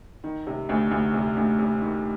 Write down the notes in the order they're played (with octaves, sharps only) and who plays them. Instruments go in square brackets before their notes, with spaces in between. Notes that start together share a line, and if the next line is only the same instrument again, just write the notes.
[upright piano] D#3
C3
D2
D2
C3
D2
C3
D#3